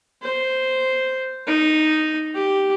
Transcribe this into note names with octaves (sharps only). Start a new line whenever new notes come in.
C5
D#4
G4